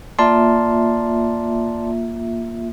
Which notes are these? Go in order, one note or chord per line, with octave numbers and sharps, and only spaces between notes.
A#3 F4 D5 E5 A5 C6